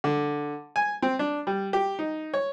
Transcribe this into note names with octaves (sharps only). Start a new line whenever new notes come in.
D3
G#5
C4
D4
G3
G4
D#4
C#5